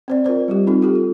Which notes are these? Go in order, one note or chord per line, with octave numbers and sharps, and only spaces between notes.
C4 C5 D5
F4 A#4 C5 D5
G3 F4 G4
C4 D#4 F4 A4
F4 G4 A4
F4